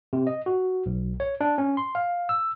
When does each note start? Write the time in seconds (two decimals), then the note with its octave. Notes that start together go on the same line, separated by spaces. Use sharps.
0.13 C3
0.27 D#5
0.46 F#4
0.86 B1
1.20 C#5
1.41 D4
1.58 C#4
1.77 C6
1.95 F5
2.29 E6